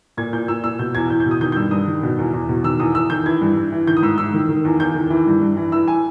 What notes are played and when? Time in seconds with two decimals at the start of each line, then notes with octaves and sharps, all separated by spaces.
0.17 A#2 G#6
0.33 A#2 G6
0.48 A#2 E6
0.64 A#2 E6
0.79 B2 G6
0.95 E2 G#6
1.05 E6
1.10 E2 G6
1.20 G6
1.26 B2
1.31 D#6
1.41 D#3 G6
1.52 G6
1.56 G2 E6
1.71 G2 D#6
1.87 D#3
2.03 B2
2.18 E2
2.33 E2
2.49 B2
2.64 D#3 E6
2.80 E2 D#6
2.95 E2 E6
3.10 D#3 G6
3.26 E3 G#6
3.41 G2
3.57 G2
3.72 E3
3.87 D#3 G6
3.97 D#6
4.02 G#2 E6
4.18 G#2 E6
4.34 D#3
4.49 D#3
4.65 E2
4.80 E2 G6
4.95 D#3
5.10 E3
5.27 G2
5.41 G2
5.57 E3
5.72 E3 E6
5.88 G#5